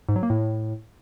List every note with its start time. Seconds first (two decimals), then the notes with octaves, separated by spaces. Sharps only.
0.09 G#2
0.16 F#3
0.23 A#3
0.30 A2